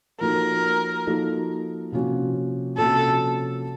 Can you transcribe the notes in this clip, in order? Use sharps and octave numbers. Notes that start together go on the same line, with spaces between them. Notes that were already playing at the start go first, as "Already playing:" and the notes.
F3 A#3 D#4 F#4 A4 A#4
F3 A#3 D#4 F#4 A4
C3 F3 A#3 C#4 F#4
C3 F3 A#3 C#4 F#4 A4